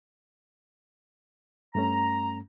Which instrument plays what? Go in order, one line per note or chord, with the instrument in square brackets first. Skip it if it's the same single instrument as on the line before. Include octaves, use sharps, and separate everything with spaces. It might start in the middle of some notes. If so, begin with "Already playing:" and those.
[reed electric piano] G2 A3 C#4 [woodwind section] A#5